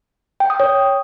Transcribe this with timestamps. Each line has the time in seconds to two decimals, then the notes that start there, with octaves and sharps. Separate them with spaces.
0.40 G5
0.50 D#6
0.60 C#5